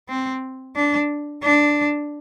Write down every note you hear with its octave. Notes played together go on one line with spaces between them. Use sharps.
C4
D4
D4